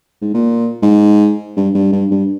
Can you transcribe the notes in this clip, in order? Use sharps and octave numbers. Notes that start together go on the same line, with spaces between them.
G#2
A#2
G#2
G2
G2
G2
G2